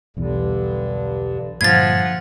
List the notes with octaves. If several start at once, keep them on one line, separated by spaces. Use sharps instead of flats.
B1 E2 G2 D3 E3
G2 A#2 D3 F3 F#5 G#6 A6